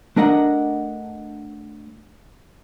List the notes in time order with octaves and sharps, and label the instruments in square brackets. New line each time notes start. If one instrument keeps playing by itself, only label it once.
[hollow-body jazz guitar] A3 D4 A#4 D#5 F#5